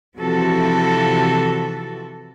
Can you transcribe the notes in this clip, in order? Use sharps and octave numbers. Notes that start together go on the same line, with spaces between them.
C3 E3 F3 F#4 A4